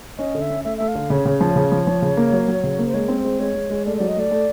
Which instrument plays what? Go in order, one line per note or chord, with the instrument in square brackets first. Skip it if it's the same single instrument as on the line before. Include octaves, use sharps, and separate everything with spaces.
[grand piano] C#4 [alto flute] D#5
[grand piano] D3
[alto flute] E5
[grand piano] C#4
[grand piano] A3 [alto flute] E5
[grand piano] A3 [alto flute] E5
[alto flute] F5
[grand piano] D3
[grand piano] C#3 [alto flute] C#5
[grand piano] C#3
F3
C#3
F3
F3
C#3
A#3
F#3
F#3
C#3
A#3
[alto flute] C5
[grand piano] G#3 [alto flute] C#5
[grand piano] C4
[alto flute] C5
[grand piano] G#3
[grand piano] G#3 [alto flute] C#5
[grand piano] G#3
G#3
[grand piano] A3 [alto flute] D5
[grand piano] F#3 [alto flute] D5
[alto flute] D#5
[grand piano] A3 [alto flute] D5
[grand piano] A3